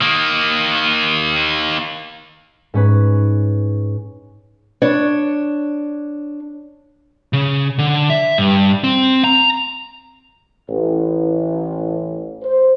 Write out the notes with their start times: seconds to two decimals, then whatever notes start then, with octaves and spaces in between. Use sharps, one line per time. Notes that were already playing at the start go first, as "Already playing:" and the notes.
0.01 D#3 A#3
2.74 G#2 C#4 B4
4.82 D4 C#5
7.33 C#3
7.78 D3
8.10 E5
8.38 G2
8.84 C4
9.24 A#5
10.68 A1
12.43 C5